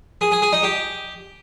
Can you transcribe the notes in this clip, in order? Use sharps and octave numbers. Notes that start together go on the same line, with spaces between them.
G#4
G#4
G#4
D#4
G4